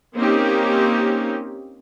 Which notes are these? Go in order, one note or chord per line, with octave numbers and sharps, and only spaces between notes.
A#3 C4 C#4 D#4 G4